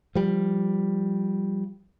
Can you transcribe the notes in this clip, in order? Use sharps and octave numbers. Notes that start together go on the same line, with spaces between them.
F3 G3